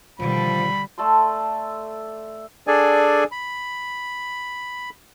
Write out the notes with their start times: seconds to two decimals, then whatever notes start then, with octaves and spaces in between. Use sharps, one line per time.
0.20 B2 D3 D#3 F3 G3 B5
0.98 A3 A4 D5 C6
2.67 D4 G#4 A4 D5 G#5
3.32 B5